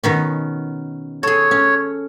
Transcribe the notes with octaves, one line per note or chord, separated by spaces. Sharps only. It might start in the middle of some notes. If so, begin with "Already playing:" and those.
B2 D#3 C#4
G#4 A4 C#5
C#4